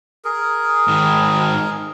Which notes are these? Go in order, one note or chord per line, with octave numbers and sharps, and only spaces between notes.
G#4 A#4
G#2 D#3